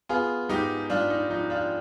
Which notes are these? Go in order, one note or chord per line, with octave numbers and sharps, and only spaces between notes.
B3 F4 G#4
G#2 D#4 G4
G#2 D4 F4
D#4
F3 D#4
D4 F4